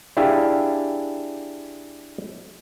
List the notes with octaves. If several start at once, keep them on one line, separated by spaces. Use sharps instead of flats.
D4 E4 G4 G#4 E5 F5